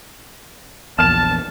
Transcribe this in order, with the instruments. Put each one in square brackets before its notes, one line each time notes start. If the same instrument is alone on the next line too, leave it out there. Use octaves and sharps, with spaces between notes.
[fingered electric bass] A#1 E2 [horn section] A5 [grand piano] F6 E7